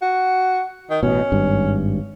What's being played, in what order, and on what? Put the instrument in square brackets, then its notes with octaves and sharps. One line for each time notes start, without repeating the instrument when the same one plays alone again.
[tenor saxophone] F#4
D#3
[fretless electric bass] A1 B2 [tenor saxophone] C#4
[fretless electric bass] G#1 G2